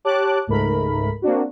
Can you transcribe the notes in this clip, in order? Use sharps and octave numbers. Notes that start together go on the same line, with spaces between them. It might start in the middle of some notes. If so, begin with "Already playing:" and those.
G4 C#5 A5 D6 F#6
C#2 G#2 A3 A#4 B5
A#3 C4 D4 F#4